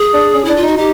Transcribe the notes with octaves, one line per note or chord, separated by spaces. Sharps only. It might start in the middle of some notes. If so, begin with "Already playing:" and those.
Already playing: G#4
D4
C#4
D4 E4
F4
D#4 F#4
D#4 G4